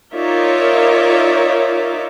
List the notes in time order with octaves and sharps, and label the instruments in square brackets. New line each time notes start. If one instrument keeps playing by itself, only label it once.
[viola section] D#4 F4 A#4 C#5 D5 E5